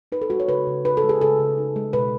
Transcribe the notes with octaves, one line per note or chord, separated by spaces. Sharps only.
D#4 B4
A4
G#3 F#4
C#5
C#3 B4
C#3
D#4 B4
A4
G#3
G#4
C#3 A4
C#3
D#4
G#3
B2 B4